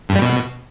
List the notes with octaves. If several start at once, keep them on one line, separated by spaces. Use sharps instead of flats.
G2
G3
B2